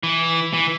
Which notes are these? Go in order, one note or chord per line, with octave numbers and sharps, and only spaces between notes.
E3
E3